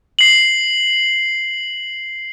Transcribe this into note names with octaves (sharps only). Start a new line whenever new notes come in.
C7 F#7